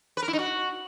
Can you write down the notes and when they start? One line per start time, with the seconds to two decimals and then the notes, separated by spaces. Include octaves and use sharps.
0.17 B4
0.22 A#4
0.28 E4
0.33 D#4
0.39 F#4